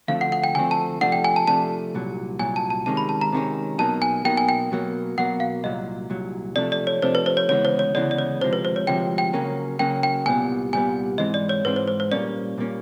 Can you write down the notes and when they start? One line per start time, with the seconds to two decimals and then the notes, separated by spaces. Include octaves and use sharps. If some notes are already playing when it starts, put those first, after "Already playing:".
0.08 D2 D3 F3 A3 C4 F5
0.21 F#5
0.32 F#5
0.44 G5
0.55 D2 D3 F3 A3 C4 G#5
0.71 A5
1.01 C3 F3 A3 D4 F#5
1.12 G5
1.24 G#5
1.36 A5
1.47 C3 F3 A3 D4 A5
1.94 C2 A#2 F#3
2.39 C2 A#2 F#3 G#5
2.56 A5
2.70 A5
2.86 C3 D#3 G#3 C#4 A5
2.97 B5
3.09 A5
3.21 A#5
3.32 C3 D#3 G#3 C#4
3.78 B2 F#3 A#3 D#4 A5
4.02 G#5
4.25 B2 F#3 A#3 D#4 G5
4.37 G#5
4.49 G5
4.71 B2 F#3 A#3
5.17 B2 F#3 A#3 F#5
5.40 F5
5.64 C2 A#2 F#3 D#5
6.10 C2 A#2 F#3
6.56 C3 F3 A3 D4 D5
6.72 D5
6.87 C#5
7.02 C3 F3 A3 D4 C5
7.15 B4
7.26 C5
7.37 C#5
7.49 D2 C#3 E3 G#3 B3 C#5
7.65 C5
7.79 C#5
7.95 D2 C#3 E3 G#3 B3 D5
8.11 D5
8.18 C#5
8.41 D2 C3 F3 G#3 C5
8.53 B4
8.65 C5
8.76 C#5
8.87 D2 C3 F3 G#3 G5
9.18 G5
9.33 C#3 F#3 A#3 C#4
9.79 C#3 F#3 A#3 C#4 G5
10.03 G5
10.26 C2 A#2 G3 B3 G#5
10.73 C2 A#2 G3 B3 G#5
11.18 G#2 E3 G#3 C4 D#5
11.34 D5
11.49 C#5
11.64 G#2 E3 G#3 C4 B4
11.76 C5
11.87 C5
12.00 C5
12.11 A#2 G3 A#3 C#4 D5
12.58 A#2 G3 A#3 C#4